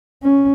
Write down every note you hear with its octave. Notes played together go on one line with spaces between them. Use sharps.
C#4